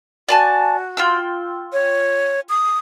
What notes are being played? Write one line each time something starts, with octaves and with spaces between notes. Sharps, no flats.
F#4 D5 G#5 A5
F4 G5 E6
C#5
D#6